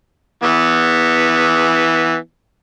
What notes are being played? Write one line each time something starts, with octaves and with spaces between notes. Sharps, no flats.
E3 B3